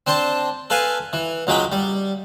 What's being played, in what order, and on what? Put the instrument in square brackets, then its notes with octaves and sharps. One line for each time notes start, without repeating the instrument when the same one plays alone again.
[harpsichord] C4 D4 C5 A5
A4 B4 F5 G#5
E3
C#2 F#3 G#3 G5 B5
G3